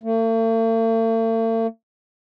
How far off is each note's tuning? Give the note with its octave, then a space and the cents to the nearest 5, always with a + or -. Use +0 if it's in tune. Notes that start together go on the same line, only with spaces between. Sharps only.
A3 +45